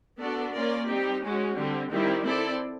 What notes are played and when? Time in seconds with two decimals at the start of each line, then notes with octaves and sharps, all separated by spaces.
0.20 B3 D4 F#4 A4 D5
0.53 A#3 C#4 F4 A#4 D5
0.88 G3 C4 D#4 G4
1.22 G#3 C#4 F#4
1.55 D3 G3 C4
1.90 D#3 G3 C4 E4
2.24 C4 E4 A4 D5